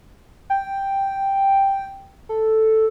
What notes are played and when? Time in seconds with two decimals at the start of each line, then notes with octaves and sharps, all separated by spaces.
0.50 G5
2.29 A4